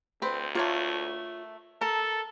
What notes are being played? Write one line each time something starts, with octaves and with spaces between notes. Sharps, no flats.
D2 C4 B4
A3 A#3 F4 C#5
A4 A#4 A5